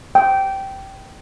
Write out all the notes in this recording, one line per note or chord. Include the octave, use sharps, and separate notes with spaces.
G5